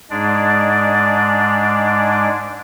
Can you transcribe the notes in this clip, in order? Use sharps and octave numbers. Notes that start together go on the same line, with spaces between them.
G#2 G#3 D4 D5